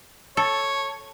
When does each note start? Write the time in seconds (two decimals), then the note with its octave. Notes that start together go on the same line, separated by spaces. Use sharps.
0.37 A4 C#5